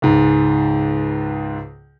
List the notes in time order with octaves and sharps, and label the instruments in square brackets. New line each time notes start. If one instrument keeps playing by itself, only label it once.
[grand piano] C#2 G#2